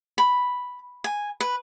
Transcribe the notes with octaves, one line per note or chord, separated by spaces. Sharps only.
B5
G#5
B4